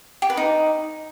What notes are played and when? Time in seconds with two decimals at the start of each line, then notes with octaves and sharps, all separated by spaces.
0.22 G4
0.30 B4
0.37 D#4